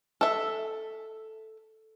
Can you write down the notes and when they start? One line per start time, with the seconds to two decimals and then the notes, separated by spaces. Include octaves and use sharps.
0.21 A4 E5